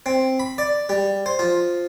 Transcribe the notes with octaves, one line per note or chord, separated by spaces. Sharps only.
C4
B5
D5
G3
C5
F3